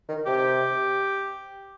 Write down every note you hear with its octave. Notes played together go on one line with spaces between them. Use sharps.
D#3
C3 G4